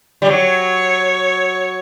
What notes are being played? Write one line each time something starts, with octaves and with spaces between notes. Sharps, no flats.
G3
F#3 C#5